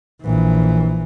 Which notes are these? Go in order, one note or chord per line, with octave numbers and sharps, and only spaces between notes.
A#1 E3